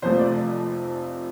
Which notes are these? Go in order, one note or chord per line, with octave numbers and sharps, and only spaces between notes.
F1 F2 C3 F3 A3 C5
D5